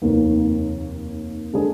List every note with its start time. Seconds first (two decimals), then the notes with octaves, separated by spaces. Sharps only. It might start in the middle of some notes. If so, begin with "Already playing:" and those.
0.02 F1 D#2 D#3 A#3
1.53 D3 G#3 D4 G#4